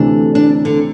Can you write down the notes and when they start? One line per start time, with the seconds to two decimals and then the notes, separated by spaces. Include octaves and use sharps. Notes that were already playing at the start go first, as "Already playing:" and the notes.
Already playing: D2 C3 E3 A3 D4
0.35 D4
0.65 D3